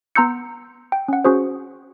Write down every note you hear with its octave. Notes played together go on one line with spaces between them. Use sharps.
B3 A#5 C6 E6 G6 C#7
G5
C#4 F#5
C#4 F#4 G#4 C5